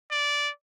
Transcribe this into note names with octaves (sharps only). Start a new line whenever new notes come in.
D5